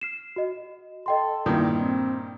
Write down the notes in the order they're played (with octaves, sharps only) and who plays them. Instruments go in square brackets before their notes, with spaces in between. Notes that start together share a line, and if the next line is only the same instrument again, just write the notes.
[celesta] F6 C7 E7
F#4 D#5
[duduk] A4 [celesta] D#5 G5 C6
[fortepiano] G2 A#2 D#3 [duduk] E4
[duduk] C4